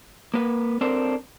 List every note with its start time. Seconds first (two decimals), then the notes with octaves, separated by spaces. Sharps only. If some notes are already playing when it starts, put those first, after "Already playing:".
0.34 A#3 B4
0.81 C4 D4 A4 A#4 C5